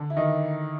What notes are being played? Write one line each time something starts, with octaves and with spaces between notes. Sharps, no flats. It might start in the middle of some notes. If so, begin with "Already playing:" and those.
Already playing: D3 D4
E4
D#3 D#4